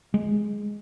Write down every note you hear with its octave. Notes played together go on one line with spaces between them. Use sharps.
G#3